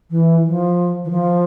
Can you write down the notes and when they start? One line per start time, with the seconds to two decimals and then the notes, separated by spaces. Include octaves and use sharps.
0.11 E3
0.47 F3
1.04 E3
1.10 F3